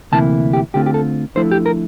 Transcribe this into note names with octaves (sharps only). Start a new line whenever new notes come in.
D2 C3 E3 A#3 E4 A5
G4
D2 D3 A3 C4 F4 G4
G4
A4
D2 D3 F3 A3 E4 C5
G4
A#4